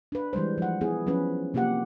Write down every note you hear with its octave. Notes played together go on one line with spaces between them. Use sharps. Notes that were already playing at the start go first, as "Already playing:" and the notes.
D4 B4
E3 G3 G#3 C5
F3 F#5
B3 E4 G#4
F3 F#3 B3 C#4 B4
C3 A#3 F4 G4 F#5